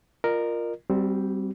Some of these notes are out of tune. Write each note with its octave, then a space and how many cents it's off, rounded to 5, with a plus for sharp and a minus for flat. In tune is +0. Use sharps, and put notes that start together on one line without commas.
F4 +0 A#4 +0 D#5 -45
G3 +0 C4 +0 F#4 +35